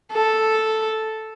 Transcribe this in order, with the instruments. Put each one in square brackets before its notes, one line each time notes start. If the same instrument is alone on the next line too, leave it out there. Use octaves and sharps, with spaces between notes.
[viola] A4